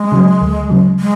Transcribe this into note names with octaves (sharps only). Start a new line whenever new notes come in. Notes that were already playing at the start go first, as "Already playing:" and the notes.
Already playing: G#3
C#3 F#3
D2
C#3 F#3
G#3